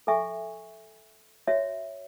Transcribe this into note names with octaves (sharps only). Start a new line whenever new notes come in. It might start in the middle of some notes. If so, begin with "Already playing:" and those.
A4 E5 G#5 C#6
F#4 C#5 E5